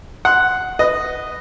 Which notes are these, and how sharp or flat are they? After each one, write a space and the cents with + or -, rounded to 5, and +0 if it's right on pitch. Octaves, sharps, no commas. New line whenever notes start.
F#5 +0 C6 +0
B4 +20 D#5 -5